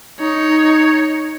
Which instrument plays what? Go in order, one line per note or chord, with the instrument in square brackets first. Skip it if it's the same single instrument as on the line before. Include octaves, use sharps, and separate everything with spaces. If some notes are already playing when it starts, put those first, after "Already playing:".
[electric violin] D#4 C#5